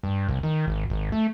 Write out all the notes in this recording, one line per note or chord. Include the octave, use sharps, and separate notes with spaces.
G2
C2
D#3
G#1
G#1
A3